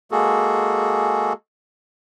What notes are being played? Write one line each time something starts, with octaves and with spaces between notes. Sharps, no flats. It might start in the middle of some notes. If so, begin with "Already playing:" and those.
G#3 A#3 F#4 G#4 A4